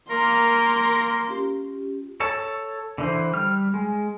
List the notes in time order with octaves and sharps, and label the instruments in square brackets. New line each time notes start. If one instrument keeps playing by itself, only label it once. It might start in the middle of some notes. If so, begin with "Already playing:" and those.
[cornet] A#3 [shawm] A#4 [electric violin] C6
[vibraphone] C#4 F4 G4
[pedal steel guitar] A4 C#5 A5
D3 E3 C5
G3 F6
G#3